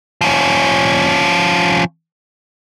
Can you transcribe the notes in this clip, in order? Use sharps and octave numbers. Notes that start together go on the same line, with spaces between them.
F3 C#4